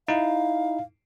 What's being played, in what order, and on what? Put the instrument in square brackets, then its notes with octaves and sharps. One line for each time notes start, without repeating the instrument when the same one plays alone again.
[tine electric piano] D#4 E4 [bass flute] F5